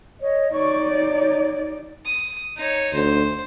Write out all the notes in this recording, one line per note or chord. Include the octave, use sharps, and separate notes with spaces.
C#5 D#5
D#4 C#5 D5 C#6
C#5
D#6
D#4 C#5
D2 C5